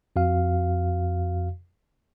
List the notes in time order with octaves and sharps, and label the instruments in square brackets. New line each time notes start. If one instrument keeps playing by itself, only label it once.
[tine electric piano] F2 F#4 F5